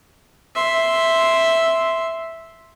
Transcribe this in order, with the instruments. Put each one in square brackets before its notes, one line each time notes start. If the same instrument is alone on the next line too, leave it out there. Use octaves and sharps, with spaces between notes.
[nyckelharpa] E5 C6